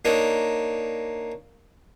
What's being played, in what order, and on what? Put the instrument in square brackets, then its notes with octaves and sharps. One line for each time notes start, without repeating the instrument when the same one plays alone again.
[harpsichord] A#3 D4 D#4 C#5